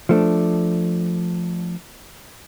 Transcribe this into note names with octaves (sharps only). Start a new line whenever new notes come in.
F3 A3 D4